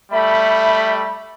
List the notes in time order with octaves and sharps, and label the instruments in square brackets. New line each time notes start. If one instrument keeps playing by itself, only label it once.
[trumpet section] G3 A3 B5 [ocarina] E5